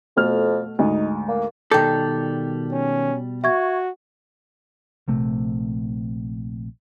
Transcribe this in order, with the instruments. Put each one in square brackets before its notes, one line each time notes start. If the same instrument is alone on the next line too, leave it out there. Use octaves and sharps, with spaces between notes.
[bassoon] F2 [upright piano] B2 A3 F6
[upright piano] D2 G#2 [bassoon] D#4
[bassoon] A#3
[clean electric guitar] B2 G3 D5 [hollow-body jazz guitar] D#3 A4 [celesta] G5 G6
[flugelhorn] C#4
[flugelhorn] F#4 [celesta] E5 C#6 G#6
[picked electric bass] A#1 C3 A3